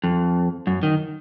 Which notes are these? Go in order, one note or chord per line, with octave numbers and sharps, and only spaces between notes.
F2
F#2
D#3